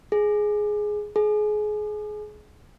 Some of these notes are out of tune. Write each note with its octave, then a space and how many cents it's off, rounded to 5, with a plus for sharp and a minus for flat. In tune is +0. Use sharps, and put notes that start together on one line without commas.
G#4 +5
G#4 +25